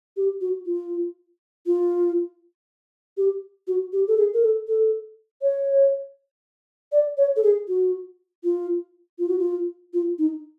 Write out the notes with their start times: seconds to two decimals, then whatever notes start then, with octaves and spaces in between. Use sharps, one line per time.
0.17 G4
0.41 F#4
0.66 F4
1.66 F4
3.17 G4
3.68 F#4
3.93 G4
4.08 A4
4.17 G#4
4.34 A#4
4.43 A4
4.68 A4
5.42 C#5
6.92 D5
7.17 C#5
7.36 A4
7.43 G#4
7.68 F#4
8.44 F4
9.19 F4
9.29 F#4
9.39 F4
9.94 F4
10.19 D#4